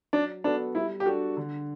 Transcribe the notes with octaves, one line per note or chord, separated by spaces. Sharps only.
F#3 D4
B3 D4 F#4 A4
G3 E4
G4
D4 F#4 A4
D3